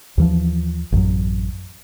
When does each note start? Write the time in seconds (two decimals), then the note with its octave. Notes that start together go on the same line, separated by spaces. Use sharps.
0.18 D#2 E3 F3
0.92 A1 F#2 F#3